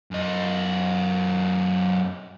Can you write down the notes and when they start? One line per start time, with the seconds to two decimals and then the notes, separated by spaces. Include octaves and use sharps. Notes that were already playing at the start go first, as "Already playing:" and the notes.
0.11 F#2 D#5